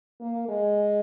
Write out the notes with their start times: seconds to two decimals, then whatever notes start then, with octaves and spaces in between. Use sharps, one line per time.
0.21 A#3
0.49 G#3